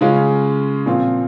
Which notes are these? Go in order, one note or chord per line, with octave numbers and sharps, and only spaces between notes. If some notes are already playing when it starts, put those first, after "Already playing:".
C#3 G#3 C#4 F4
A#2 F3 C4 F4